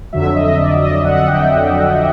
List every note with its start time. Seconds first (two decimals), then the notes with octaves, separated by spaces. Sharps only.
0.13 F2 D3 F#3 E5
0.35 D#5
0.58 D5
0.76 D5
0.81 D#5
1.05 F#5
1.28 G5